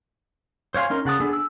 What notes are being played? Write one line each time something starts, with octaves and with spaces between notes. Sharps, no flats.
C5 C#5 F5 G#5 C6
C#4 D#4 A#4
C#3 F#5 A5 D#6
B3 D4 G#4 A4
E6